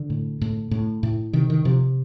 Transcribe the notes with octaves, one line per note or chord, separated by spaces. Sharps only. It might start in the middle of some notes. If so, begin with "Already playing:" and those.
Already playing: D3
A2
A2
A2
A2
C3 D#3
D#3
C3 F3